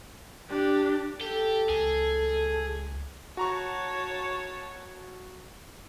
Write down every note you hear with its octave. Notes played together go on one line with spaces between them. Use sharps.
D4 G4
G4 A4
C#2 G#4
F#4 C#5 A5 A#5 C#6